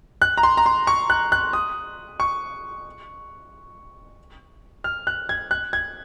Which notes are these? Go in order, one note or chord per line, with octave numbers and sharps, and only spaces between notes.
F#6
A#5
C6
A#5
C6
C#6
F#6
F#6
D#6
C#6
F6
F#6
G#6
F#6
G#6